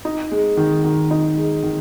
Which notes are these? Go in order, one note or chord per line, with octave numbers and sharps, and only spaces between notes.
D#4
G#3
D#3
D#3
D#4
G#3
D#3